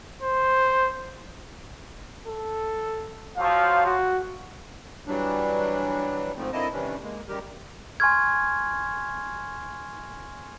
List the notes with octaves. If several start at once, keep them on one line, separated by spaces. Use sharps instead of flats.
C5
A4
F3 F#3 F5
F#4
E3 F#3 G3 D4
G#2 F3 A3 C4
D3 A#3 C4 E4 D#5 A5
C3 D#3 E3 G3 C#4 D4
G#3 A#3
F#2 D#3 G3 G4 A#4
G#5 C6 C#6 F6 G#6